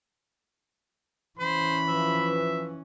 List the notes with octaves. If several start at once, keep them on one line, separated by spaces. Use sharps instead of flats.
E3 C#4 C5 B5
F3 B4 E5